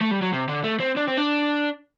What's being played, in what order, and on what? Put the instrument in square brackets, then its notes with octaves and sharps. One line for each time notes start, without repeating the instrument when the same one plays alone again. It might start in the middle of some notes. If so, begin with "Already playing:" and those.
[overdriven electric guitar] A3
G3
F#3
C3
D3
A3
C4
D4
C4
D4